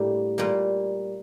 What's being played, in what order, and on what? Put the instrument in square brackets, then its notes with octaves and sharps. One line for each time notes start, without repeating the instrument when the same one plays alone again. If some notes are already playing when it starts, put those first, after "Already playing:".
Already playing: [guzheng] A2 G3 A#3 D4 E4 G4
A#2 G3 A#3